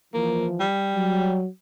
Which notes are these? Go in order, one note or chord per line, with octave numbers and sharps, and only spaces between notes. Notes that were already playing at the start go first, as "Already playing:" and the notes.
E3 F3 A#3
G3
F#3